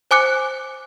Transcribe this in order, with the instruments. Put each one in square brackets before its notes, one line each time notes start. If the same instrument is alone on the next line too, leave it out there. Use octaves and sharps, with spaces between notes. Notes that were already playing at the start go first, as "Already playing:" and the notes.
[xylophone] C5 G#5 D6 F#6 C#7